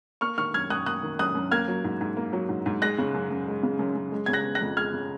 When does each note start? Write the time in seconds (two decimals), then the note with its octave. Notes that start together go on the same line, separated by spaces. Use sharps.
0.21 A#3 C#6 F6
0.38 D#3 C#6 F6
0.54 F#2 F6 G#6
0.70 F#2 D#6 F#6
0.86 A#3 D#6 F#6
1.03 D#3
1.19 F#2 D#6 F#6
1.35 F#2
1.51 A#3 F6 G#6
1.68 F#3
1.84 G#2
2.01 G#2
2.17 A#3
2.33 F#3
2.49 G#2
2.66 G#2
2.82 G#3 F#6 A#6
2.98 C#3
3.15 F#2
3.31 F#2
3.47 G#3
3.63 C#3
3.79 F#2
3.96 F#2
4.12 G#3
4.26 C#3 G#6
4.33 F#6 A#6
4.45 B3
4.55 F#6 A#6
4.61 F2
4.77 G#3 F6 G#6
4.94 C#3